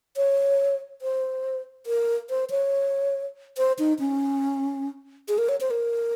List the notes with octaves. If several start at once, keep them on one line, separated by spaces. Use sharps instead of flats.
C#5
C5
A#4
C5
C#5
C5
D#4
C#4
G#4
A#4
C#5
C5
A#4